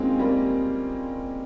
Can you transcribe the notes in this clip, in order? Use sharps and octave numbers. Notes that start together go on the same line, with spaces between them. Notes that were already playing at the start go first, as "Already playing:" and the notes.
Already playing: G#3 A#3 C4 C#4 D#4 F4
G3 A#3